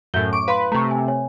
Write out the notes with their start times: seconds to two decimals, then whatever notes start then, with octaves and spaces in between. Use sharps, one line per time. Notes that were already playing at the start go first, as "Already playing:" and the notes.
0.14 F#2 A2 E5 G6 G7
0.33 C#6 D6 D7
0.48 B4 F5 B5 C6
0.72 C3 A3 A#5 C#6
0.91 G#5
1.08 C#5 G#5